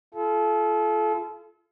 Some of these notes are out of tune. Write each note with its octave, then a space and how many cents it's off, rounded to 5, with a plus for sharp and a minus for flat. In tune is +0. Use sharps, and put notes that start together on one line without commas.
F4 -35 A4 -35